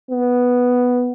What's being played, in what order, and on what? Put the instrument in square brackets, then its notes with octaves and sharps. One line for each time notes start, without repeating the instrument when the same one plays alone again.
[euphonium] B3